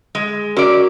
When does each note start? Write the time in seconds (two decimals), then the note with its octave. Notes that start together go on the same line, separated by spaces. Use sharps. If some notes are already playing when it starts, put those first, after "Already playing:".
0.15 G#3
0.57 C#4 F#4 A#4 D5